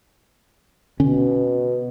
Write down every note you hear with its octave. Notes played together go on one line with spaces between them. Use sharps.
B2 D3 C#4